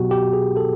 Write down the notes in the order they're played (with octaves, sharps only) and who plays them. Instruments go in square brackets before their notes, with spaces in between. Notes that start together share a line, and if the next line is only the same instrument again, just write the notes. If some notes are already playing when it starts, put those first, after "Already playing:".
Already playing: [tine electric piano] B2 F#3 B3 F#4 G4
G4
G#4
A4